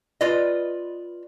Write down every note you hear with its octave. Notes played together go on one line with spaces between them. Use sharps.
F4 B4 D5 D#5